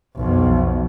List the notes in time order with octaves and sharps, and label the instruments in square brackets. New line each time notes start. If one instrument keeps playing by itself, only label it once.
[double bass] B1 F2